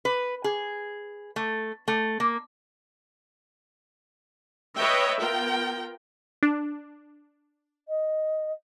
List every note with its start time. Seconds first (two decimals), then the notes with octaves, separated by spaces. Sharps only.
0.05 B4
0.44 G#4
1.36 A3
1.88 A3
2.20 A#3
4.77 B4 C#5 D#5 E5 G5
5.20 B3 F4 A#4 G5
6.43 D4
7.88 D#5